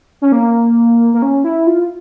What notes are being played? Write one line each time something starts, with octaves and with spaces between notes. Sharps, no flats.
C#4
A#3
A#3
C#4
E4
F4